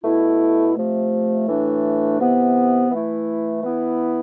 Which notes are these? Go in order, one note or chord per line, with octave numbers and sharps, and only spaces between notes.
B2 A3 E4
C3 F3 A3
A2 E3 A3 D4
C3 E3 B3
E3 A3 E4
E3 B3 E4